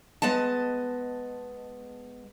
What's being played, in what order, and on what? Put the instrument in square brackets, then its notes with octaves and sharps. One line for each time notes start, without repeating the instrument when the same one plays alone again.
[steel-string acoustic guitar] G#3 B3 D#5 A5